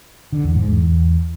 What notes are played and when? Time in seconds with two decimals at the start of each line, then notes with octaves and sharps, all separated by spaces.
0.32 D3
0.44 E2
0.55 G#2
0.67 E2